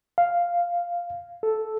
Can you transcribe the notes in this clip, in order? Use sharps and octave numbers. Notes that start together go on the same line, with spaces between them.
F5
A4